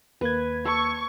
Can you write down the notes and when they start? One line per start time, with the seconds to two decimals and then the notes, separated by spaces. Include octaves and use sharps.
0.21 D#2 A#3 B4 G#6
0.65 A4 C#6